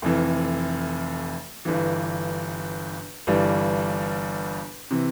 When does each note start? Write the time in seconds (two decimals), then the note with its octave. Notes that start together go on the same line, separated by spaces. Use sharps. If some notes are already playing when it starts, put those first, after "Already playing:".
0.02 F1 F2 E3
1.65 G1 G2 E3
3.27 G1 G2 E3 G3
4.90 C3 E3